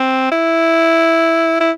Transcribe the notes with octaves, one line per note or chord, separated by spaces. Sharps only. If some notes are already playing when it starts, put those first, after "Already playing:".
Already playing: C4
E4
E4